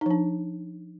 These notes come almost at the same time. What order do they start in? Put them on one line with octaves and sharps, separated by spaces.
D#4 F3 D4